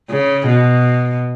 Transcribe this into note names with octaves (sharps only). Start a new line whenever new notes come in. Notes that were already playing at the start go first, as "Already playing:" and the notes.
C#3
B2